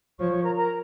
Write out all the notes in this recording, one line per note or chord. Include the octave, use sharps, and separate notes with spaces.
F3 C#5 C#6
C#5 C#6
A#4 A#5
A#4 A#5